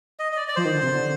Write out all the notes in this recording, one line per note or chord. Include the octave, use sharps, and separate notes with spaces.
D#5
D#5
D5
D5
F3 C5
D#3
D3
C3
D3